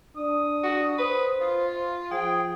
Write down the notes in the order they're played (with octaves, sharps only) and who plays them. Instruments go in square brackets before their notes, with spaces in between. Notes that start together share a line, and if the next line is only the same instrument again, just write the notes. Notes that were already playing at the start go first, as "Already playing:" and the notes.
[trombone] D4 [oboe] D#6
[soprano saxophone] F#4
[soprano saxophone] B4 [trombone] C5
[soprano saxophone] F4
[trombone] F3 [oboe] G#4 [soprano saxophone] G5